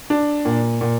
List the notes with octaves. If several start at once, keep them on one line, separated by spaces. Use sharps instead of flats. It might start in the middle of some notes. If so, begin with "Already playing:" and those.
D4
A#2
A#2